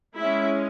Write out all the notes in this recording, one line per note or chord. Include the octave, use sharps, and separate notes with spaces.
G#3 C#4 E4 E5